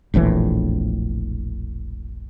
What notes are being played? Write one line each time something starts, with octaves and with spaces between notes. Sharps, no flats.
E1 A#1 A2 E3